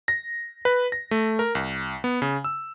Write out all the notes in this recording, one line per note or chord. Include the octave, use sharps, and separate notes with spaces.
A#6
B4
A#6
A3
A#4
C2
B3
C#3
E6